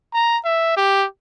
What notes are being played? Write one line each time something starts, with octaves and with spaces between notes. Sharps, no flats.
A#5
E5
G4